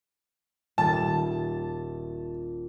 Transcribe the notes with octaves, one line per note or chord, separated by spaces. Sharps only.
D#1 A5 A6